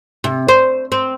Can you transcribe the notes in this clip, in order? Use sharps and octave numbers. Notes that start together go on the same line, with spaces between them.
C3
C5
C4